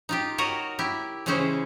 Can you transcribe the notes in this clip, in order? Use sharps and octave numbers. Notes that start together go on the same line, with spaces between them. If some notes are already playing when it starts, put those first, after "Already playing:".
D#4 F4 G4
F#4 A#4 C#5 D#5
E4 G4
C#3 E3 G#3 C#4 E4 C5